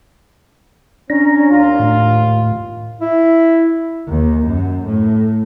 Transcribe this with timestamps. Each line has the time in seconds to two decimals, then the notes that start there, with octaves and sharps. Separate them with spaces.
1.10 C#4 D4 A#5
1.50 D#2 F4
1.79 A2
3.01 E4
4.07 D#2
4.47 F#2
4.86 A2